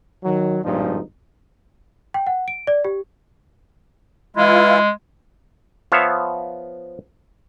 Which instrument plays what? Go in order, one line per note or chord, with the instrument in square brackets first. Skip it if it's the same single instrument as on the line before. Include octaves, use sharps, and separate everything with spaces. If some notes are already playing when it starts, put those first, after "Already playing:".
[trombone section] D#3 F#3
G#1 G2 A#2 F3 D#4
[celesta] G5
F#5
D7
D5
G4
[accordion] E3 E4 F4 [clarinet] G#3
[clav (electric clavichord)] F3 B3 C#5 E5 F5